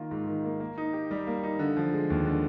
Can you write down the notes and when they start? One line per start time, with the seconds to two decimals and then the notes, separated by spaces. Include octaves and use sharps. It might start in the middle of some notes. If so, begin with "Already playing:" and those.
Already playing: D#3 A#3 F4
0.11 G#2
0.27 D#3
0.45 A#3
0.60 A#3
0.78 D#4
0.93 G4
1.11 G3
1.27 A#3
1.43 D#4
1.59 D3
1.77 F3
1.93 G#3
2.10 D#2
2.26 D3